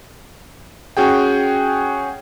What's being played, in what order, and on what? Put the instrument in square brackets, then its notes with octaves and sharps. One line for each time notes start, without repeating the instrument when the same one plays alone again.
[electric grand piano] C#4 F#4 G#4 G5